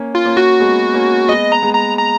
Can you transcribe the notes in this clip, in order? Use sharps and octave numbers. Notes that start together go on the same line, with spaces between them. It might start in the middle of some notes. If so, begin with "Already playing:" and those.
Already playing: A#3 C#4
F4
A#3 C#4
F#4
G#3 B3
A#3 C#4
G#3 B3 D#5
A#5
G#3 B3
A#5
A#5